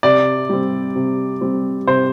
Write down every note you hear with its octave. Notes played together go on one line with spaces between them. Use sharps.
C3 D5
G3 C4
C3
G3 C4
C3 C5